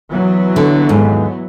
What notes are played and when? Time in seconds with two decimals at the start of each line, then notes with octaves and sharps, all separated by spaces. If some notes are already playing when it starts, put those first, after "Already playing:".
0.11 E3 F#3 B3
0.56 D3
0.89 D#2 G#2